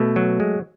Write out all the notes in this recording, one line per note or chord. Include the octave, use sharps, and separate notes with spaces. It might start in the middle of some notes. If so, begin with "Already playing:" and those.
Already playing: B2 A3
F#3
G#3